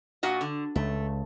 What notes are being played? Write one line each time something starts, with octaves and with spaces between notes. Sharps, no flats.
A#2 F#4 D#5
D3
C#2 A3